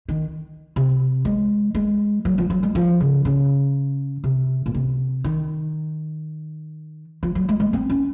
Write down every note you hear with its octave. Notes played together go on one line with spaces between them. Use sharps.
D#3
C3
G#3
G#3
F#3
F3
F#3
G#3
F3
C#3
C#3
C3
A#2
C3
D#3
F3
F#3
G#3
G#3
C4
C#4